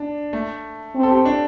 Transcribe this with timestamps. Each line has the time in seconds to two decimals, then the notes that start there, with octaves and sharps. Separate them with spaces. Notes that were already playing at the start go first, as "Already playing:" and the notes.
Already playing: D4
0.33 A3
0.95 C4
1.03 A4
1.11 G4
1.25 D4